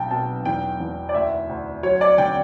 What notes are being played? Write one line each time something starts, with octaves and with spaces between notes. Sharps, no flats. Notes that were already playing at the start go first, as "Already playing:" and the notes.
Already playing: B1 G5 A5
B2 A5
E2 G5
E2
D5
D2 E5
D2
F#3 C#5
D5
D3 G5